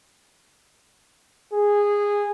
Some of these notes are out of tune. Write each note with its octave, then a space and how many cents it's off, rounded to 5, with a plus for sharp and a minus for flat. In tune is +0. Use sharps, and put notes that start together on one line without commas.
G#4 -15